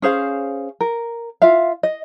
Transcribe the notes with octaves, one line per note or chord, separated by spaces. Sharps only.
C#4 G#4 C5 F5
A#4
F4 E5 F5
D#5